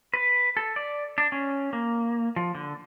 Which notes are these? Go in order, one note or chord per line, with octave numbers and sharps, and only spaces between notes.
B4
A4
D5
D4
C#4
A#3
F3
D3